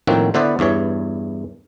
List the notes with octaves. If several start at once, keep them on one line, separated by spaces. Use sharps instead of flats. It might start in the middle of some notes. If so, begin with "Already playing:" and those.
A2 D#3 F3 A#3 C4 F#4
D3 B3 E4 B4 C5 D5
E2 G2 E3 C#5